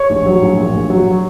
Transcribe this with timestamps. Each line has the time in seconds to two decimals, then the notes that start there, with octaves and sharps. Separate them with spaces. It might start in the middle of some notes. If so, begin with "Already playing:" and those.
Already playing: C#5
0.10 A#1
0.26 F#3
0.42 A#1
0.58 A#2
0.74 A#1
0.90 F#3